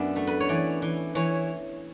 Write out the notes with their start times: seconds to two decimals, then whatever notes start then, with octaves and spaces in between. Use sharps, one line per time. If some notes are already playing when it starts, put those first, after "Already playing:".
Already playing: F#2 B3 D4 E4
0.16 A3
0.27 B4
0.40 C#5
0.49 E3 D5
0.82 E3
1.15 E3 C#5